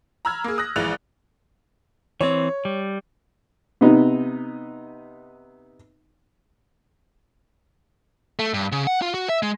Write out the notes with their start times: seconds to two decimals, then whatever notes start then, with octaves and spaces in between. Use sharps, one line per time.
0.25 A#5 B5 E6 F6 G#6
0.44 A#3 G#4
0.58 D#6 F#6 A#6
0.76 A#1 E3 G#3 F#6 A6 F7
2.21 E3 C4 C#5
2.65 G3
3.81 C3 B3 D#4
8.39 A3
8.54 G2
8.72 C#3
8.87 F#5
9.02 F4
9.14 F#4
9.29 E5
9.43 G#3